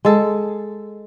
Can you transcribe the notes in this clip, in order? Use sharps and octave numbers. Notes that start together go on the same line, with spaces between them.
G#3 A4